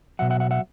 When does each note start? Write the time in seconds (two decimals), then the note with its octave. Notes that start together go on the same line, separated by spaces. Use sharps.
0.19 B2 F#3 E5 F#5
0.30 E5 F#5
0.40 E5 F#5
0.51 E5 F#5